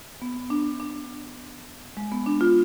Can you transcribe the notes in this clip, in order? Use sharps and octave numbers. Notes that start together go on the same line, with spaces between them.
B3
D4
D4
G#3
B3
D4
F4